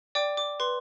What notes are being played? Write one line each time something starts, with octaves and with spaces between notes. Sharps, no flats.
D5 G5 D6
D6
B4 C6